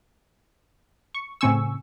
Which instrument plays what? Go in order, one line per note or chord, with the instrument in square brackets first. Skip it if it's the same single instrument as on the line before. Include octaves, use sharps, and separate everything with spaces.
[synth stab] C#6
A2 C#3 C4 G#5 C#6 E6